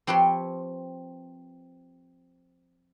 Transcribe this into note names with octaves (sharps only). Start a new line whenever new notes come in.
F3 C4 G4 B4 C#5 C6